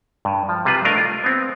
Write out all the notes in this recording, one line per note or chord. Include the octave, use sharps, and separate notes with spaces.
G2
F3
C3 G3 F4 B4
A3 D4 A#4 D#5 F5
F4
B3 C4